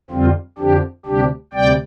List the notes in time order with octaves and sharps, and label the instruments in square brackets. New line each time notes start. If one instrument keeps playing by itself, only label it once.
[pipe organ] F2 D3 G3 C4 F4
F2 D3 F3 D4 G4
D2 C3 G3 D4 G4
D2 C3 G3 D5 G5